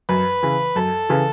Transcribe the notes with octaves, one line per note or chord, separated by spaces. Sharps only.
F#2 B4
C#3 E3
F#2 A4
C#3 E3